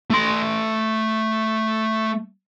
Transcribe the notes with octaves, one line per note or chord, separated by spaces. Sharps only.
A3 C6